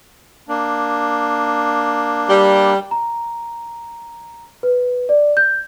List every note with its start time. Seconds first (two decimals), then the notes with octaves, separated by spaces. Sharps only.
0.49 A#3 D4
2.30 G3
2.91 A#5
4.63 B4
5.09 D5
5.37 G6